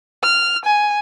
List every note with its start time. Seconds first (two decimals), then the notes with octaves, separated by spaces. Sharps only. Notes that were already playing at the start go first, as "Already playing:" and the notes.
0.22 F6
0.65 G#5